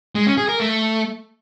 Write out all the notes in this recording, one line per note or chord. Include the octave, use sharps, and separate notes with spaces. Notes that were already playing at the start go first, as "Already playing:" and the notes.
G#3
C#4
G#4
A#4
A3